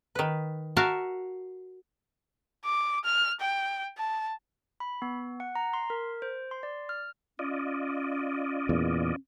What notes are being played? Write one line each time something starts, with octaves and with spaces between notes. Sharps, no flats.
D#3 B4
F#4 A#4 E5 F5 A5
D6
F6
G5
A5
B5
B3
F#5
A#5
C6
A#4
C5
C6
D5
F6
C#4 F4 D5 D#5
E2 A#2